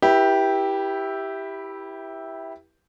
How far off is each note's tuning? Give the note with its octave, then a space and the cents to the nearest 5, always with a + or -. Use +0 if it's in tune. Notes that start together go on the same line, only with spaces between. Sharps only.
E4 -5 G4 +0 B4 -35